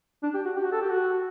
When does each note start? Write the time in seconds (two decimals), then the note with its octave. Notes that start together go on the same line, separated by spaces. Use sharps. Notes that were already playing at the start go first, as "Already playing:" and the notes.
0.23 D4
0.34 G4
0.45 F#4
0.56 G4
0.64 F#4
0.72 A4
0.81 G4
0.89 F#4